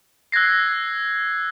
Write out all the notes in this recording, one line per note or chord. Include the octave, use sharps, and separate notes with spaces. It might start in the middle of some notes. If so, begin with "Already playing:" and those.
E6 F#6 G#6 A#6 C7